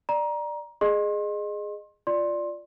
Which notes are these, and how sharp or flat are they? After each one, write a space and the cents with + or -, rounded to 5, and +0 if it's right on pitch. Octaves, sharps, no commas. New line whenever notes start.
D5 +15 A#5 +20
G#4 +0 D#5 -25 C6 +35
F4 +0 D5 +0 C6 +20